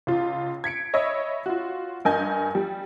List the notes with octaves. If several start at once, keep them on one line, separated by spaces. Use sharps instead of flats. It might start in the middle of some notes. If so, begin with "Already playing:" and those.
C#2 F4
G#6 B6 C#7 D7
C#5 D#5 E5 B5 E6
F4 F#4
G2 A#4 D#5 G#5 G6
G3